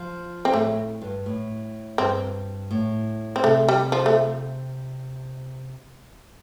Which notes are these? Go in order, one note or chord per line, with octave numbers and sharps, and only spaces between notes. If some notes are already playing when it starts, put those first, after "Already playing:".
Already playing: F3
C4
A2 A3
G2
A2
G2 C4
A2
C4
C3 A3
G3
F3
A3